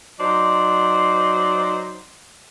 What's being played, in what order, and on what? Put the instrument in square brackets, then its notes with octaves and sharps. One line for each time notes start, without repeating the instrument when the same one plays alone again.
[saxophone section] F#3 D#4 C5 D5 D#5